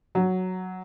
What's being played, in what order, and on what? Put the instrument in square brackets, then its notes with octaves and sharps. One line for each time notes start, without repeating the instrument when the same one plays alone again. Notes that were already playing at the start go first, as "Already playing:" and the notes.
[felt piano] F#3